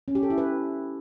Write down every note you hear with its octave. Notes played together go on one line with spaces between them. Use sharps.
C#4
G4
A4
E4
B4